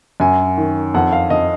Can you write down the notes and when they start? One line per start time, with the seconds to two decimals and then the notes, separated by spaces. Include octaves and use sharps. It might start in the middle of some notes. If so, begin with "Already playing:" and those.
0.20 F#2 G#5
0.57 D#3
0.94 F2 F#5
1.13 F5
1.30 F2 D#5